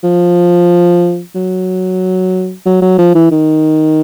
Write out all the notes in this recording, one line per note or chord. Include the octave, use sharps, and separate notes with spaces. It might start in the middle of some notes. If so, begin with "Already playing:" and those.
F3
F#3
F#3
F#3
F3
E3
D#3